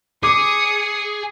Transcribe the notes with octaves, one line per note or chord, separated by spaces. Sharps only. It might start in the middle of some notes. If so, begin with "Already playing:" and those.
G#4 D6 D#6 C#7